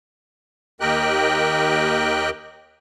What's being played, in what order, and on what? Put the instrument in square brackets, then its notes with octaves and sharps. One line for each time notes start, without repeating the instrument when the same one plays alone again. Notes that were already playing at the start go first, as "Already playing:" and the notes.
[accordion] D#2 G4 A#4 D#5 G5 F#6